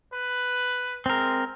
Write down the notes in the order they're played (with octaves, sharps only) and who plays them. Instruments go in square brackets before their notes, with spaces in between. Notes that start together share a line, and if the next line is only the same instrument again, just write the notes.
[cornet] B4
[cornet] G#3 [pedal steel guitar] C4 A#4